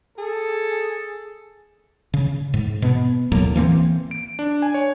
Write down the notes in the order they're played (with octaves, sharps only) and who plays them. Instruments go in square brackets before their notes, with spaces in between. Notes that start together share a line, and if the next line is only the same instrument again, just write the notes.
[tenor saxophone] G#4 [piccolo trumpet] A4
[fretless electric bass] C#3
G#2
B2 B3
D#2 A2 F#3 A#3
E3 A#3 C4
[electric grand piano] D7
D4
G#5
C#5